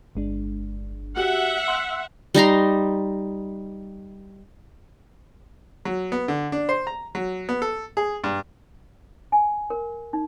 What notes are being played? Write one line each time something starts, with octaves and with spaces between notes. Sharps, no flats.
G1 G#3 D4
F#4 G4 E5 F#5
C6 E6 F#6
G3 D#4 A#5 C6
F#3
B3
D3
D4
C5
A#5
F#3
B3
A4
G#4
G2
G#5
A#4
D#4